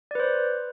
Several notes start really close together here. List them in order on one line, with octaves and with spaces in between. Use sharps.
D5 B4 C5